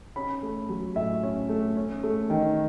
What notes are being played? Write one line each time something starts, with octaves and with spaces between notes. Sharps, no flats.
C#4 B5
A3
F#3
A2 E5
C#4
A3
C#4
A3
D#3